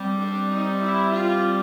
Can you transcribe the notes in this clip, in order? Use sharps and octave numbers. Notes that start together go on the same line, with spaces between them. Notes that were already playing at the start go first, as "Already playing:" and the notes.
Already playing: G3 C4
D4
D#4
E4
F4